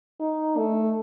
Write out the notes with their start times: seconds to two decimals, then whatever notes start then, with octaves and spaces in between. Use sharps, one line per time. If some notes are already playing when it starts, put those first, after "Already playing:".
0.20 D#4
0.57 A3